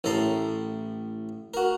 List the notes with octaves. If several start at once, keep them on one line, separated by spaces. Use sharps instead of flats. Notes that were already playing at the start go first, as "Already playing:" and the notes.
A1 A2 A4 A#5 C6
F#4 A#4